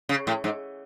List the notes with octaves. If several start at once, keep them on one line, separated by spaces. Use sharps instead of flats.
C#3
A2
G#2